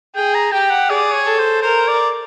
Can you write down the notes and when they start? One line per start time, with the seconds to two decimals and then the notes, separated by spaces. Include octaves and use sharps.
0.15 G#4 G5
0.35 A#5
0.52 G4 G5
0.70 F#5
0.90 G#4 D5
1.14 C#5
1.27 A4
1.38 C5
1.63 A#4 C5
1.88 D5